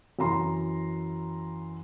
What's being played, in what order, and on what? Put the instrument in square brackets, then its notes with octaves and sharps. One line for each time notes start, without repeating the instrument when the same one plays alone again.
[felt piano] F#2 E3 A#5 C6